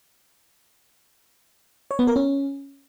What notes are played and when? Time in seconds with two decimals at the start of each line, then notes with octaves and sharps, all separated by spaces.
1.91 C#5
1.99 B3
2.07 A#4
2.16 C#4